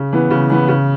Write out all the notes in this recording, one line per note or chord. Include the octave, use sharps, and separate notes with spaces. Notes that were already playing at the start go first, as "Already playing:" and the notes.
Already playing: C#3
E3 B3
C#3
E3 B3
C#3